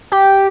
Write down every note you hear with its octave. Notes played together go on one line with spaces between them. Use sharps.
G4